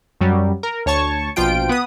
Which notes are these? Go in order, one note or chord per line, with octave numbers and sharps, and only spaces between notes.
F#2 F#3 G3
A#4
D2 C#5 A5 C#6
A#1 B2 F3 F4 G5 D7
B3 B4 D#6